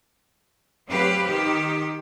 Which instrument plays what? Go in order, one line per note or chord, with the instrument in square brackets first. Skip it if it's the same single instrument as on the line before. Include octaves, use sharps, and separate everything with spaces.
[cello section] F#3 C4 G4 B4 F5
D#3 G4